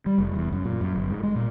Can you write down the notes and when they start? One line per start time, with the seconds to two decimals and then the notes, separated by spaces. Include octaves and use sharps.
0.06 G3
0.18 F1
0.35 E2
0.52 F#2
0.65 A#2
0.81 F#2
0.96 G1
1.10 G#2
1.23 G#3
1.36 A#2